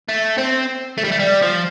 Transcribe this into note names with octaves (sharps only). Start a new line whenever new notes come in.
A3
C4
A3
G3
A3
G3
F3